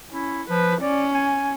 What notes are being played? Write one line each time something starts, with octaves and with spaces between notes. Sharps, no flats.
C#4 E4
F3 B4
C#4 D5
G#5